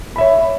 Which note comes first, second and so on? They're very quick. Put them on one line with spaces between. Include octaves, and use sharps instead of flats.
B5 E5 C#5